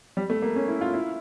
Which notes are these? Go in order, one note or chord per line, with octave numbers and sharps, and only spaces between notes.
G3
A3
A#3
C#4
E4
F4
E4